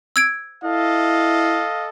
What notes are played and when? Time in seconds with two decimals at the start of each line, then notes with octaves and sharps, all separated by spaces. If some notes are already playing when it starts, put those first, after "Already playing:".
0.16 E6 G#6 D7
0.64 E4 A4 D#5 F5